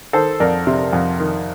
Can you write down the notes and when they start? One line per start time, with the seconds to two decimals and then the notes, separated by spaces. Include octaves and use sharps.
0.13 D#3 A4 C5
0.40 F2 A#4 D5
0.67 C3
0.93 F2
1.20 D#3